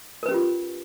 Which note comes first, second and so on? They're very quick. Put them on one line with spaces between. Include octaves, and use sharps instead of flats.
A#4 B4 C#4 G4 F4